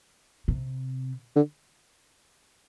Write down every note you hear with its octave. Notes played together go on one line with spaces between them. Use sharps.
C3
D3